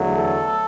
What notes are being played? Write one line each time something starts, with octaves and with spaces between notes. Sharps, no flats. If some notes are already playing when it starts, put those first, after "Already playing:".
Already playing: E2 D3 F#3 A3
A4